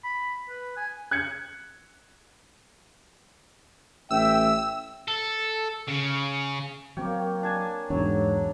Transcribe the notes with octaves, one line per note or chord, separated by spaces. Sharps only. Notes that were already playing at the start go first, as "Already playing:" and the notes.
B5
B4
G#5
F#6 G#6 C#7
A1 E5 G5 E6
A4
C#3
F#3 A#3 C4 C#5 G5
D4 G#5 A5
B1 E2 G#2 F#3 D4